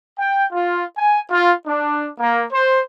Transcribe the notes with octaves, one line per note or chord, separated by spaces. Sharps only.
G5
F4
G#5
F4
D4
A#3
C5